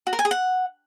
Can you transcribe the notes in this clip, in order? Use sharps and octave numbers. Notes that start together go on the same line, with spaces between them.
F#4
A#4
G#5
G#4
F#5